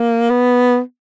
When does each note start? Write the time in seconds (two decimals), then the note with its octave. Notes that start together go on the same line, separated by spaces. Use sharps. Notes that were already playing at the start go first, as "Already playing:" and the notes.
Already playing: A#3
0.30 B3